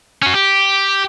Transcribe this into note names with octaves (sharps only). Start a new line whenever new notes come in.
C#4 F#4
G4